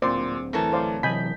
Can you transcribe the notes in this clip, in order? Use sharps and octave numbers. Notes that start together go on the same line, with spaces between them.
D1 A#2 C4 C5 D5 C6
E3 A3 A#4 C#5 A5
C5 D5 F5
C3 E3 F#3 D#5 G#5 B5 G6 B6